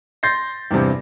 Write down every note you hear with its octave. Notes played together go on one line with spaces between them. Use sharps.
C6 G6 A6 A#6 C7
E2 G2 C3